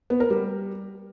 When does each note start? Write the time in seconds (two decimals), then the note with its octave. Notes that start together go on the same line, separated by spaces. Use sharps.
0.10 B3
0.20 A#4
0.30 G3